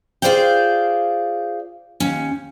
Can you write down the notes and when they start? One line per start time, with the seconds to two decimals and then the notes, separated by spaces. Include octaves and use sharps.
0.22 F4 G#4 C5 D5 F5 G5
2.00 D#2 C#4